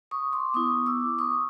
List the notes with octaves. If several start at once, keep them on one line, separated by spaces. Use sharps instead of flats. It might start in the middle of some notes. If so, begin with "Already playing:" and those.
C#6 D#6
C6 D6
B3 E4 C#6 D#6
D6 E6
C#6 D#6